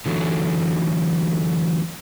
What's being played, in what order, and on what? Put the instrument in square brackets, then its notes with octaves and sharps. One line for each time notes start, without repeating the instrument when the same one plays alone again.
[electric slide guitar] D3 E3 F#3 A3